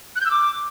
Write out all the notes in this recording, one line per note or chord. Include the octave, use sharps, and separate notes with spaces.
F#6
G6
E6
D6